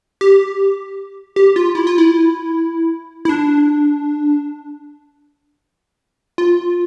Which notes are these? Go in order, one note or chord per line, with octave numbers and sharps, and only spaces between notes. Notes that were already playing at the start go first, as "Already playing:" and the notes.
G4
G4
F4
E4
F4
E4
E4
D4
F4